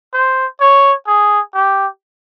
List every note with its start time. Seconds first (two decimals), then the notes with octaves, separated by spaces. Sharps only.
0.14 C5
0.61 C#5
1.07 G#4
1.54 G4